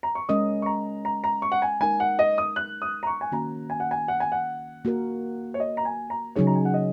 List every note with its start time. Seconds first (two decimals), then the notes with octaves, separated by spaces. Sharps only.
0.03 A#5
0.15 C#6
0.29 G#3 C#4 A#4 D#5 D#6
0.62 C#6
0.66 A#5
1.05 A#5
1.24 A#5
1.42 C#6
1.52 F#5
1.62 G#5
1.80 G#3 D#4 A#4 G#5
2.00 F#5
2.19 D#5
2.38 D#6
2.56 F#6
2.82 D#6
3.03 A#5
3.07 C#6
3.21 G#5
3.32 D#3 A#3 C#4 F#4 A#5
3.70 G#5
3.80 F#5
3.91 G#5
4.08 F#5
4.20 G#5
4.32 F#5
4.85 A#3 F#4 A#4
5.54 C#5
5.60 D#5
5.77 A#5
5.85 G#5
6.10 A#5
6.36 C#3 F#3 D#4 G#4 C#5
6.47 A#5
6.55 G#5
6.65 F#5
6.74 D#5